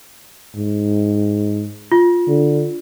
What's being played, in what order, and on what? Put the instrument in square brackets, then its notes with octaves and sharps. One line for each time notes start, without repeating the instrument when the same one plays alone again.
[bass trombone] G#2
[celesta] F4
[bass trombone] D3